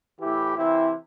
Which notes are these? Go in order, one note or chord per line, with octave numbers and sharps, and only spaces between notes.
A2 E3 E4 G4
C3 E3 C4 E4